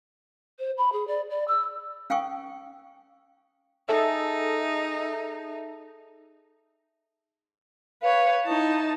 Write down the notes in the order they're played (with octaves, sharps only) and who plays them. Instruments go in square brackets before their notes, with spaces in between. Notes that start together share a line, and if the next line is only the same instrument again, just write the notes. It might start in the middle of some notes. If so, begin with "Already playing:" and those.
[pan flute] C5
B5
G#4
D5
D5
E6
[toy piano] C#4 F5 G5 G#5 C#6 D#6
[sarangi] D#4 [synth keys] G#4 A4 E5
[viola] B4 C#5 [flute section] F5
[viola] D#4 A5 [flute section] E4